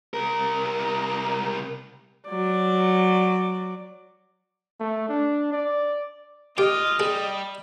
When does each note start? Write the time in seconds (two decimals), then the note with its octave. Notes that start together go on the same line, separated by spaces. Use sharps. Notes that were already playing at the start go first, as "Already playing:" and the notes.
0.14 C2 A#4
2.29 F#3 D5
4.80 A3
5.09 D4
5.53 D5
6.58 F4 G4 D#5
7.00 G3 G#4